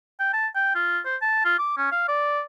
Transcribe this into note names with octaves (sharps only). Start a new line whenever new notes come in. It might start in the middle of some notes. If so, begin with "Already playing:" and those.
G5
A5
G5
F4
C5
A5
F4
D6
C#4
F5
D5